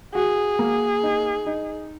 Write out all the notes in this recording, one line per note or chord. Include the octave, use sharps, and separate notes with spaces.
F#4 G#4
A#3
D#4
D#4